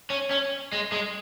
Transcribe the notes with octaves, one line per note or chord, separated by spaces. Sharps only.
C#4
C#4
G#3
G#3